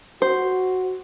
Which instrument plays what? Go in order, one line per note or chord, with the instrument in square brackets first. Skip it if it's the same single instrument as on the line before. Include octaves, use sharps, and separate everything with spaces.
[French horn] F#4 [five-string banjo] C5